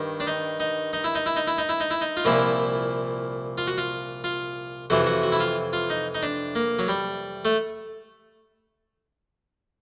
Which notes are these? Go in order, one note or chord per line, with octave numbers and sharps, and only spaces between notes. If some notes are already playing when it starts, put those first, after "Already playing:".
Already playing: G2 D#3
D4
D#4
D#4
D#4
E4
D#4
E4
D#4
E4
D#4
E4
D#4
E4
D#4
F4
C2 A#2 F3 E4
F4
F#4
F4
F4
F2 C3 E3 F#4
F#4
F#4
E4
F4
F4
D#4
D#4
D4
A#3
F#3
G3
A3